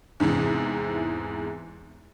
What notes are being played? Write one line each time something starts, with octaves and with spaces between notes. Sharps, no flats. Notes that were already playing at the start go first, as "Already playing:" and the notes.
E2 G#2 C3 E3